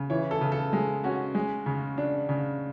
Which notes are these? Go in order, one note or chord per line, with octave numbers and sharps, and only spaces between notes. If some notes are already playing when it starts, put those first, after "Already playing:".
Already playing: C#3
E3 C#5
A4
C#3
A4
G#3
C#4 F#4
G#3
C#3
D4
C#3